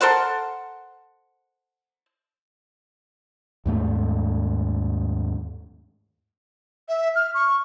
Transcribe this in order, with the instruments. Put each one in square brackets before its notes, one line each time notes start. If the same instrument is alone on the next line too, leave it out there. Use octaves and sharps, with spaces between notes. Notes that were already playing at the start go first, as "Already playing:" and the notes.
[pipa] A4 A#4 C5 F#5
[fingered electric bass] D#2 G#2 A3
[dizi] E5
F6
C#6